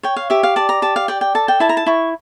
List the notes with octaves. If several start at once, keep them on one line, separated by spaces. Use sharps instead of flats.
C#5 G5
F5
G4 E5
F5
D5 A5
A#5
G4 A5
F5
D5 G5
G5
A4 A5
G5
E4 A5
A#5
A5
E4 C#6